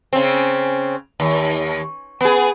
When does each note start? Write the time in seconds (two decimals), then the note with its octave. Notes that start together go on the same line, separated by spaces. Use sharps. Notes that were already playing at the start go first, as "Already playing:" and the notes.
0.13 C#3 C4
1.20 D#2
2.21 B3 G#4